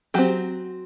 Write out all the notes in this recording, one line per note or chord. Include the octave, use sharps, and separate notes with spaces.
F#3 C4 G4